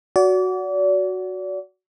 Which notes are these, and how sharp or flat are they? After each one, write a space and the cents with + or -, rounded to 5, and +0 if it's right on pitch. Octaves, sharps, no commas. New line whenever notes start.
F#4 +0 D5 -35